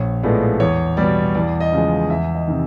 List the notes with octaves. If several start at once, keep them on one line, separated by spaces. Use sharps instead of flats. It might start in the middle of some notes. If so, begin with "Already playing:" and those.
Already playing: A#1 C#5
A2 F3 G#3 B3 D5
E2 C#5
B2 G3 D5
E2 D5
D#5
C#3 F3 G#3
E2 E5
D#5
C3 D#3